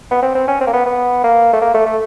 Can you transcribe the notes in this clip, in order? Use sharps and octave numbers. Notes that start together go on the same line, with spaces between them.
B3
C4
C4
C#4
C4
A#3
B3
B3
A#3
A3
A#3
A3
A3